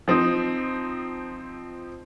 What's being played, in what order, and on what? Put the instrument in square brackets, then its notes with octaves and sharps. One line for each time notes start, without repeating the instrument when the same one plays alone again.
[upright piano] F3 C4 D#4